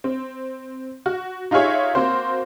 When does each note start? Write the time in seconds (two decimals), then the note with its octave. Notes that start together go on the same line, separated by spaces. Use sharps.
0.04 C4
1.06 F#4
1.51 D#4 F4 G4 G#4 C#5 E5
1.95 A#3 C4 F#4 C5